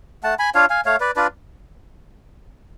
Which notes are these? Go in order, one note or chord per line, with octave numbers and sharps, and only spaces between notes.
A3 F#5 A5
G#5 B5
D4 F4 C#5 F5
F5 G#5
A3 C#5 F5
B4 D5
D4 F4 B4 D5